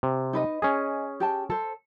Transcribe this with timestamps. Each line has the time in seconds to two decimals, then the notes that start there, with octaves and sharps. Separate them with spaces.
0.03 C3
0.33 D#4 B4 D#5
0.62 C#4 G#4 D#5
1.20 G4 G5 A5
1.50 A4 C5